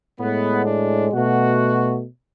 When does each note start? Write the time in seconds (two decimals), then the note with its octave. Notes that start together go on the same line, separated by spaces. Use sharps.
0.19 A2 G#3 B3
0.65 D4
1.12 B2 A3 F#4